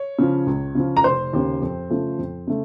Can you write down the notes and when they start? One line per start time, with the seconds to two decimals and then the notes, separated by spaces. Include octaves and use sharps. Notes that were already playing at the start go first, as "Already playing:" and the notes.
Already playing: C#5
0.19 C#3 F3
0.47 C#2
0.75 C#3 F3
0.97 A#5
1.04 F1 C5 C6
1.33 D#2 C#3
1.62 F2
1.90 C#3 F3 A3
2.19 F2
2.48 C#3 A3